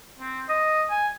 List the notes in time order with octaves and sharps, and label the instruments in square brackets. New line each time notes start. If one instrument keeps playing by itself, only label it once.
[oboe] C4
D#5
G#5